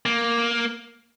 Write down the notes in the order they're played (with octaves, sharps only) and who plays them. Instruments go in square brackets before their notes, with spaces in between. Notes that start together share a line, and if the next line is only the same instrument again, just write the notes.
[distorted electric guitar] A#3